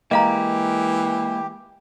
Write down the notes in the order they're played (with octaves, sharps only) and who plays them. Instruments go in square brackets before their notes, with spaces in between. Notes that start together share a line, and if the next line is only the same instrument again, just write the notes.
[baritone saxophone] E3 [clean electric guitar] G#3 A#3 [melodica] G4 [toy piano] D#5 F5 A#5